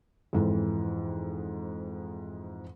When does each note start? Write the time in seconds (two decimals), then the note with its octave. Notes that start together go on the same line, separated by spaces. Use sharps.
0.33 F2 G#2 E3